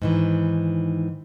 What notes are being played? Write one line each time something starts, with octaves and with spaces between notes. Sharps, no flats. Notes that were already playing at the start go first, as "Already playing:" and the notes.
G#2 D#3 E3